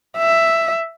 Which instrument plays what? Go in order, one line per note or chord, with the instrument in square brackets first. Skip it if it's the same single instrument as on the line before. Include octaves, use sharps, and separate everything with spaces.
[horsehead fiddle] E5